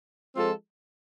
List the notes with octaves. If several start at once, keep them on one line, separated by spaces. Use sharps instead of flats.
F3 G#3 C4 F4 A4